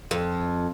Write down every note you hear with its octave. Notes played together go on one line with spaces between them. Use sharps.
F2